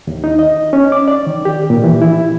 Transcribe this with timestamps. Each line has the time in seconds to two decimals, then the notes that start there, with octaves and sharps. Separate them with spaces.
0.07 D#2
0.24 D#4
0.39 D#5
0.73 C#4
0.92 D6
1.08 D5
1.27 D#3
1.45 G4
1.70 A#2
1.84 E3
2.02 E4